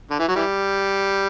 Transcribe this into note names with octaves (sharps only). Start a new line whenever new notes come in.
D3
E3
F#3
E3 G3